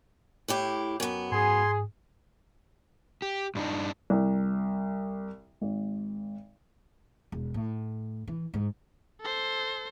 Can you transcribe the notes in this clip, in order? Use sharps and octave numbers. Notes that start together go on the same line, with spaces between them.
A2 E4 G4
F#2 B3
G#2 G#4 G#5 C6
G4
G2 D4 D#4
C2
G#1
E1
A2
E3
G#2
A4 C5